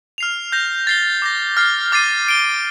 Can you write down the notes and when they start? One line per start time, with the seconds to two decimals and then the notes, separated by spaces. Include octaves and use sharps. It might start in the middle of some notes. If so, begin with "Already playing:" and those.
0.18 F6 C7 F7
0.52 G6 A#6 F7
0.87 A6 C7 G7
1.22 D6 G6 A#6
1.57 F6 A6 C7
1.92 D6 F6 A6 C7 D#7
2.26 A6 D7 G7